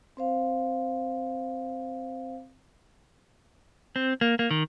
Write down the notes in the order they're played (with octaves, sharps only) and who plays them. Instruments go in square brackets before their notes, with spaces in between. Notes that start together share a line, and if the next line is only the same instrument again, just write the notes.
[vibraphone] C4 C5 F5
[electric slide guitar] C4
A#3
A#3
D#3